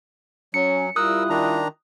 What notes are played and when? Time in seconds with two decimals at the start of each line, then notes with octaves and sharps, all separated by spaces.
0.54 F#3 C#4 C#7
0.96 G3 E4 F4 A#4 D#6 E6 F#6
1.30 D#3 D4 A#5